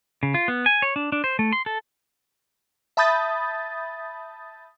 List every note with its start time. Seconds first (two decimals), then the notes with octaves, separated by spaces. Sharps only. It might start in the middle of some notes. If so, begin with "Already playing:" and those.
0.23 C#3
0.34 F4
0.48 B3
0.66 G#5
0.82 C#5
0.96 D4
1.12 D4
1.24 C5
1.39 A3
1.53 C6
1.66 A4
2.97 E5 A5 B5 D#6 G6 A6